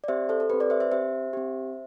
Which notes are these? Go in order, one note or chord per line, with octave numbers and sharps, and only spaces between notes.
D5
C4 G4 C5 E5
A4 C5
A4
C4 G4 B4
B4 D5
C5 E5
C5 E5
C4 G4 C5 E5
C4 G4